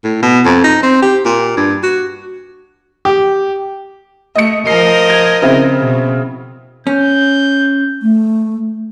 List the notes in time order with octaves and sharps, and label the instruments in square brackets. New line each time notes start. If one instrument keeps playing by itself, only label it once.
[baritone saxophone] A2
B2
F2
D#4
C4
G4
A#2
G2
F#4
[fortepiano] G4
[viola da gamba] A3 [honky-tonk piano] D#5 C#7
[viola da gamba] F3 A#4 D#5 [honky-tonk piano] C7
[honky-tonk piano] G#6
C#3 C4 E4
[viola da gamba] B2
[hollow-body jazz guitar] C#4 [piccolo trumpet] G6
[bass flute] A3